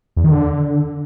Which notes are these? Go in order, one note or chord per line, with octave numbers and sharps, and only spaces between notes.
E2
D#3
D3